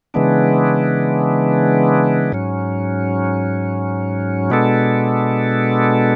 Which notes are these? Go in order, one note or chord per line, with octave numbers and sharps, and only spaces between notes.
C#3 E3 G#3 B3 D4
G#2 F#3 C#4
B2 G#3 B3 D4 A4